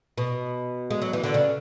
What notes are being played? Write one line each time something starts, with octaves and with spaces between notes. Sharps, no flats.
B2
G#3
F#3
E3
D3
C#3